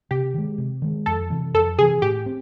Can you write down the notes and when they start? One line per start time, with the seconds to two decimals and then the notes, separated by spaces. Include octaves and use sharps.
0.11 C3 G4
0.34 D#3 G#3
0.58 C3
0.82 D#3 G#3
1.06 F2 A4
1.30 C3 E3
1.54 F2 A4
1.79 C3 E3 G#4
2.02 A2 G4
2.26 C4